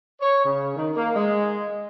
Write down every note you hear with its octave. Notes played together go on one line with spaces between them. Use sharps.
C#5
C#3
D#3
A#3
G#3